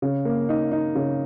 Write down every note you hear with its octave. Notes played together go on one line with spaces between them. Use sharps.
C#3
A#3
D#4
D#4
C#3